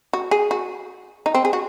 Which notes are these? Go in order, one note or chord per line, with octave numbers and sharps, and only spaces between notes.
F#4
G#4
F#4
D#4
C4
G#4
F#4